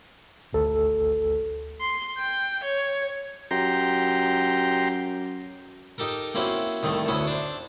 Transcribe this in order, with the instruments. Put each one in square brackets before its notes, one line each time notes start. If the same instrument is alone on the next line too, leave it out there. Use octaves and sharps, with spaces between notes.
[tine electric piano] G#1 D2 A4
[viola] C6
G5
C#5
[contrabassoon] F#2 [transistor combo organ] G4 A#5 C6
[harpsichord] D#4 G4 A4 A#4
A#3 C4 C#4 E4 F#4
C2 D#3 A3
D2 B3 C#4 E4
D4 C5